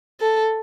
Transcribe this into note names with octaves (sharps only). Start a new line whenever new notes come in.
A4